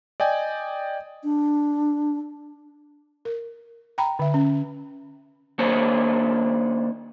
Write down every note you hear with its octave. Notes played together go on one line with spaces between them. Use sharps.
D5 D#5 G5 G#5
D4
A#4
G5 A#5 B5
D3 E5
C#4
D#3 A#3 C#4 D4 C5 C#5